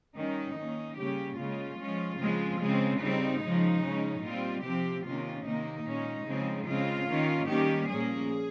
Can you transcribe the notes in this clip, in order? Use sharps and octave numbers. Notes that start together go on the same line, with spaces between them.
D#3 G3 C#4 D#4
D#3 A#3 C#4
C#3 G3 A#3 C#4 G4
C#3 G#3 C#4 F4
F3 G#3 C#4
C#3 F3 G#3 C4
C#3 G#3 C4
C#3 G3 C4 D#4
C#3 F3 G#3
C#3 F3 G#3 C#4
A#2 G3 C4 F4
C3 F3 C4 G4
C3 D#3 A#3 C#4 F4
C3 D#3 A#3 D#4
A#2 G#3 C#4
C#3 F3 G#3 C4
C#3 G#3 C4 F4
D#3 A#3 C#4
D#3 G3 A#3 C#4 G4
A#2 F3 A#3 C#4 G#4